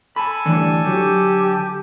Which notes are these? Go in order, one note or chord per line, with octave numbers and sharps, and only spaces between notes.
A4 G#5 A5 B5
A2 D3 E3 G3
D3 F#3 G4